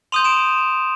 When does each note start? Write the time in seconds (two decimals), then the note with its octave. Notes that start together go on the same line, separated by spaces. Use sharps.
0.12 C6 D#6 G6 D#7 F7
0.24 D7 E7